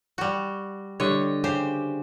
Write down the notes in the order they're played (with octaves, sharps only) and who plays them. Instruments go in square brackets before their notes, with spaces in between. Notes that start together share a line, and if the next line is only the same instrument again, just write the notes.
[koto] G3 F#4
[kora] D3 G3 [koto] C#5 D#5
[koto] C#3 G4 C5